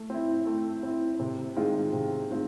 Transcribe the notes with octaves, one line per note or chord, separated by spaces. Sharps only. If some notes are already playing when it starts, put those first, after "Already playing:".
Already playing: A3
C4 E4
A3
C4 E4
C3
D#3 G#3 C4 F4
C3
D#3 G#3 C4 F4